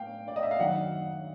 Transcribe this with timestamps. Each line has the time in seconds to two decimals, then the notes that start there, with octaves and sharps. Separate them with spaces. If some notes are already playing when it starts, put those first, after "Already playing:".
Already playing: A2 F5 G5
0.28 D5
0.36 D#5
0.43 E5
0.51 F5
0.59 F#2 D#3 F#5